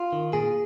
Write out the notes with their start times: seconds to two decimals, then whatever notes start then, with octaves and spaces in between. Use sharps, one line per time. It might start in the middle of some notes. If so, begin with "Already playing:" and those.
Already playing: F4
0.13 D#3
0.33 A#2 G#4